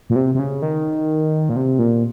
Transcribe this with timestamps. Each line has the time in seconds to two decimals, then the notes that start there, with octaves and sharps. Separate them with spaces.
0.10 A#2
0.16 C3
0.35 C3
0.39 C#3
0.62 D#3
1.49 A#2
1.56 C3
1.79 A#2